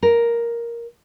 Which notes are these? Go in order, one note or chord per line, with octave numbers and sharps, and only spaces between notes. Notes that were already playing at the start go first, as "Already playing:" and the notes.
A#4